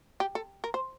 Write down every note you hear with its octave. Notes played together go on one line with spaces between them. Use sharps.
G4
A4
A#4
C5